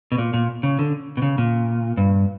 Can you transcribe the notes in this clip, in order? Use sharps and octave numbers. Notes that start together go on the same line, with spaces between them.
B2
A#2
A#2
C#3
D3
B2
C#3
A#2
G2